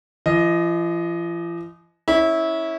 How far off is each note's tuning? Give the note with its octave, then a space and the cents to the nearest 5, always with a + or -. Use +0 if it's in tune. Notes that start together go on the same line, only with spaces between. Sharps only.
F3 -45 D#5 +0
C#4 +0 E4 -20